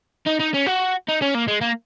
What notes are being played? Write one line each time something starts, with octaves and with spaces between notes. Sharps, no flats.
D#4
D#4
C#4
F#4
D#4
C#4
A#3
G#3
A#3